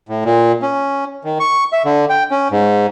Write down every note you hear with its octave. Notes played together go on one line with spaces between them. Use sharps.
A2
A#2
C#4
D#3
C#6
E5
D3
G5
C#4
G#2